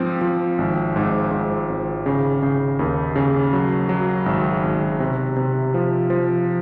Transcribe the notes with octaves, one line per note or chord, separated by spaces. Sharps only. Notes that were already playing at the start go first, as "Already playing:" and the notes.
Already playing: G#2 F3 C4
F3
G#1
G#2
G#2
G#1
C#3
C#3
D#2
C#3
F#3
F#3
G#1
G#1
C3
C3
F3
F3